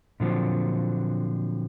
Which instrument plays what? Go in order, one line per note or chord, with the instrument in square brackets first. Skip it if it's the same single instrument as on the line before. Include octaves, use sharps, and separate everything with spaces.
[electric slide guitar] A#2 D3 F3 F#3 C4